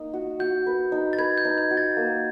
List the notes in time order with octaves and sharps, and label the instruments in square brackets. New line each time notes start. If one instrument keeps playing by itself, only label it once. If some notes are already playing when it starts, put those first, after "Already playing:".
Already playing: [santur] A#3 D#4
F#4
[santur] F#4 [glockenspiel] G6
[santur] B4
D#4
[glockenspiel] A6
[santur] B4 [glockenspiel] G#6
[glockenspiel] G6
[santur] D#4
[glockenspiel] G#6
[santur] F#4
[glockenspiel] A6
[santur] A#3